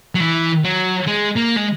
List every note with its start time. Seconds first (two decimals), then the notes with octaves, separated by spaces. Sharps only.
0.15 F#3
0.20 E3
0.64 F#3
1.08 G#3
1.37 A#3
1.57 G#3